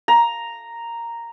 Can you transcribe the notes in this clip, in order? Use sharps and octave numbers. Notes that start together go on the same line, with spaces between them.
A#5